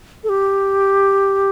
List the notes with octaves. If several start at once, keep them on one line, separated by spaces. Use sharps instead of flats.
A4
G4